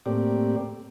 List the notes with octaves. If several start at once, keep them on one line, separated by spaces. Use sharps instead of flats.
A2 A#3 C4 G4 D5